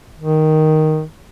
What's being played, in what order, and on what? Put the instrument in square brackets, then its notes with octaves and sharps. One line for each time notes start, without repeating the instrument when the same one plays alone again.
[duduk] D#3